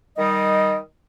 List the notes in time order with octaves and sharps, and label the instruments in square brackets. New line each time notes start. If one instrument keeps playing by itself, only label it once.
[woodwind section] D#3 G3 D#5